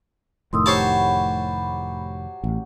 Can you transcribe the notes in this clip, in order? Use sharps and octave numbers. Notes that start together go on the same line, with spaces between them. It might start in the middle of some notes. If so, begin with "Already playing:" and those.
F1 A2 D#3 C6 D#6 E6
F#3 F#4 G4 C5 C#5 A5 B5
A1